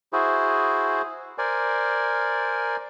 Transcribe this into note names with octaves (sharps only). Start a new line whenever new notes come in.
E4 F#4 G#4 C5
A#4 C5 D5 G#5